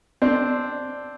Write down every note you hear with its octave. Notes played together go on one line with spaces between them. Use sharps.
C4 D4